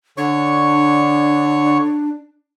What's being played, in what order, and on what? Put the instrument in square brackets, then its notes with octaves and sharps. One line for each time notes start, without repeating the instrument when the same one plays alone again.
[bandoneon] D3 C#5 C#6 [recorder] D4